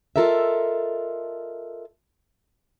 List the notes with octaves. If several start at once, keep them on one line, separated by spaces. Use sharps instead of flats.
F4 A4 A#4 D#5 E5